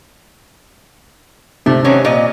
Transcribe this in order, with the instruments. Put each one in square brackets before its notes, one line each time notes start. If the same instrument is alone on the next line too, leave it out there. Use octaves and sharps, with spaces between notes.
[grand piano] C3 [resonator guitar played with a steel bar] A3
[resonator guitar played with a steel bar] D#3 F#3 C#4
A#2 D#5